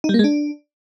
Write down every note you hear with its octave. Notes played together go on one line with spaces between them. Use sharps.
D#4
G3
A#3
G#3
D4